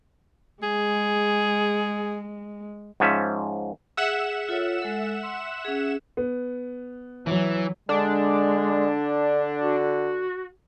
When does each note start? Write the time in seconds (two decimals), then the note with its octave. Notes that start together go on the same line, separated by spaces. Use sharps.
0.63 G#3 G#4
3.00 G#2 F3 C#4 E5
3.97 G#4 E5 F#5 E7
4.49 F4 A4 C#5
4.82 G#3 A4
5.23 C6
5.65 C#4 G#4
6.17 B3
7.26 E3 F#3
7.89 D3 G#3 D4
9.61 F#4